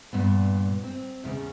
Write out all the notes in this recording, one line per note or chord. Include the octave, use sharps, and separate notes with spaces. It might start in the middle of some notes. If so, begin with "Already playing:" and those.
G2 A#2 B3
C4
E2 A#2 C#3